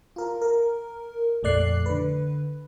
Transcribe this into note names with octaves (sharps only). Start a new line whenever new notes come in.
F4 A#4
A#4
A#1 F2 A3 D5 F#6 C7
D3 B4